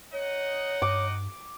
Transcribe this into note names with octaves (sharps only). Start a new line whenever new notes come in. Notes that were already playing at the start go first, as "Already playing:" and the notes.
D#4 C#5 D#5 F#5
G2 D6